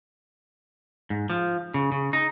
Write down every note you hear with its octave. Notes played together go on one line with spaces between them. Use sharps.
G#2
F3
C#3
C#3
D#4